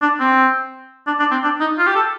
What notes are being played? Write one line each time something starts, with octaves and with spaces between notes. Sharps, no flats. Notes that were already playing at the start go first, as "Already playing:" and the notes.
D4
C4
D4
D4
C4
D4
D#4
F4
G4
A4